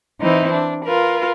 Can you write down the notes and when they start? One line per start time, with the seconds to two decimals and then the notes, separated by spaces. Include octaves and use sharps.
0.21 E3 C4 D#4 E4
0.52 D4
0.84 F4 A#4 B4